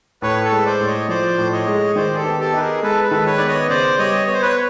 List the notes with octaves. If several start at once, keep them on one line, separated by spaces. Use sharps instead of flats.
A2 B4 C#5
A4 B4
G#3
C5 D5
A2
C#5 D#5
F3 C5 D5
A2
C#5 D#5
G#3
D#3 C5 D5
G#4
G4 A4
B3
G4 A4
D#4 B4
G#4 A#4
G#3 A4 B4
A4 B4
D#3
B4 C#5
B3 D5
C#5 D#5
C#3 C5 D5
G3 C#5 D#5
B3 C#5
C5
B4 C#5